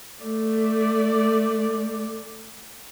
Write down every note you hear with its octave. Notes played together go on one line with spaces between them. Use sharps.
A3 D5